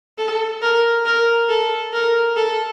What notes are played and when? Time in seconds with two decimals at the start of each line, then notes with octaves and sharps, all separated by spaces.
0.18 A4
0.62 A#4
1.05 A#4
1.49 A4
1.93 A#4
2.37 A4